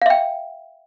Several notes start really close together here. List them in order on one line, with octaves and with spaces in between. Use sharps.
F5 E5 G5